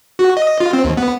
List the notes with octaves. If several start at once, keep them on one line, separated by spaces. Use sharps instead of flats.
F#4
D#5
F4
C4
D#2
B3